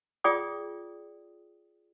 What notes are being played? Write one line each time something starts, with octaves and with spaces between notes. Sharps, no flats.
F4 G#4 D5 G5 D#6